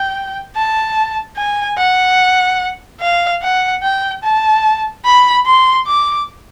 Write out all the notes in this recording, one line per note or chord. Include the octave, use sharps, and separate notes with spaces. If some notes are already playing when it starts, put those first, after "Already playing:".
Already playing: G5
A5
G#5
F#5
F5
F#5
G5
A5
B5
C6
D6